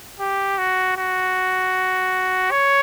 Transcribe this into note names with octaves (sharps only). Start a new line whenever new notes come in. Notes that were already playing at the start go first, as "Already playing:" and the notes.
G4
F#4
F#4
C#5